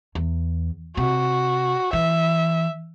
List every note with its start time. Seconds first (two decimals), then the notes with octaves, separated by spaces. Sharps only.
0.15 E2
0.97 C3 F#4
1.93 E3 E5